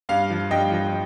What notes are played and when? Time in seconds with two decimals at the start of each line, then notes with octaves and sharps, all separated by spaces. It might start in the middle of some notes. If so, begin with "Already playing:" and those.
0.09 G2 F5
0.30 F3
0.51 G2 D#5 G5
0.72 F3